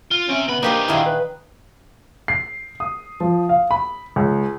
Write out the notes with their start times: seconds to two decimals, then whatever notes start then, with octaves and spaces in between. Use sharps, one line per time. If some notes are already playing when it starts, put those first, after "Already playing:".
0.11 F4
0.29 C4 C#4 E5
0.48 C#3 B3 B5
0.63 A#3 D4 D#4 G4 B4 C5
0.88 A#2 D#3 E4 G#4
1.06 B4
2.28 C7
2.80 D#6
3.20 F3
3.49 F5
3.71 B5
4.16 C#2